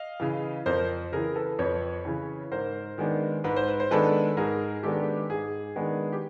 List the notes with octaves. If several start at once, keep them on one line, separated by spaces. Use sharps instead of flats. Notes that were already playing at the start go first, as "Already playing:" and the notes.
Already playing: D#5 F5
C#3 E3
F2 A#4 C5
C#3 E3 G#4 A#4
A4 B4
F2 B4 C#5
C#3 E3
G#2 A#4 C5
D#3 G#3 B3 D4
G#2 B4
C5
B4
C5
D#3 G#3 B3 D4 A4 B4
G#2 G#4 A#4
D#3 G#3 B3 D4 G4 A4
G#2 G#4
D#3 G#3 B3 D4
G4